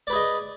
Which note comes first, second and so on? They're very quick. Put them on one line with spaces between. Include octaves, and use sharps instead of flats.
D5 B4 G#4 D#5